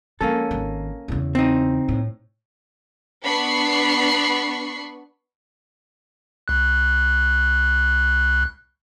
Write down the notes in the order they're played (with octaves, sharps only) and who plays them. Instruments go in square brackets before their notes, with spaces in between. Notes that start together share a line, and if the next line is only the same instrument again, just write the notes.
[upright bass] F3 G#3 [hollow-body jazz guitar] A#3 C#4 A4
[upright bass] G#1 D#3
E2 C#3
[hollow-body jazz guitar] C4 D#4
[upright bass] A2
[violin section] B3 D4 B5 C#6 C7
[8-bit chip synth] C2 F#6